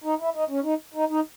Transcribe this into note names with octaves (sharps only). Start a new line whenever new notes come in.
D#4
E4
D#4
C#4
D#4
D#4
D#4